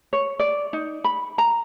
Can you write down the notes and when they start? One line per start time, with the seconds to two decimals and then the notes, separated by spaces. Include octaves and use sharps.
0.13 C#5
0.39 D5
0.73 D#4
1.04 B5
1.38 A#5